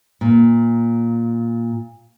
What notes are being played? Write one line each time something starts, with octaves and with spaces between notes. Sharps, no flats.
A#2